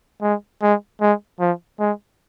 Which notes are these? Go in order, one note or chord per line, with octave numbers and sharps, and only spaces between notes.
G#3
G#3
G#3
F3
G#3